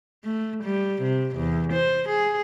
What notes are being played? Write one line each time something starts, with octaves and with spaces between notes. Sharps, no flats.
A3
G3
C3
E2
C5
G#4